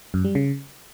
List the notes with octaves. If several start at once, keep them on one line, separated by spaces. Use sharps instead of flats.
F#2
G3
C#3